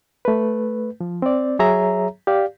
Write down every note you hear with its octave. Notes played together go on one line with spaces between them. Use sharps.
A3 B4
F3
C4 D5
F#3 G#4 C#5 E5 A#5
G4 D5 F5